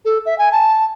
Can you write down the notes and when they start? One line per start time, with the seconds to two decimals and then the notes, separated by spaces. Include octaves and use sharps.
0.05 A4
0.26 E5
0.38 G#5
0.52 A5